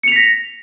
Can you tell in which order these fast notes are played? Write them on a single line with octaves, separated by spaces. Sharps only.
C#7 F7 B6 A#6